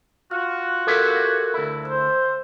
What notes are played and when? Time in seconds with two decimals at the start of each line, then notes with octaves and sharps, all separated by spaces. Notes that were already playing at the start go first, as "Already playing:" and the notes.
0.31 F4 F#4 F6
0.87 G4 A4 A#4 C#5 E5
1.54 D2 E4
1.85 C5 E6